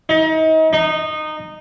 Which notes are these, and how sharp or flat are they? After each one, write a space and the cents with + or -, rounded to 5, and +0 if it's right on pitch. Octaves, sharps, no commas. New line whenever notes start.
D#4 +35
D#4 -15